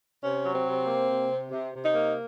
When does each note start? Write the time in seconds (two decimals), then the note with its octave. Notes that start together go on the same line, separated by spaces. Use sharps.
0.21 C3 C#4
0.43 F#3
0.54 C4
0.65 C3
0.87 A#3
1.08 C3
1.30 C3
1.51 C3
1.73 C3
1.84 D#4
1.94 A#3